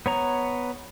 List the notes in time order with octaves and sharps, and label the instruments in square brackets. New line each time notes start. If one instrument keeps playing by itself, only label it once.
[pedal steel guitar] B3 C#5 A#5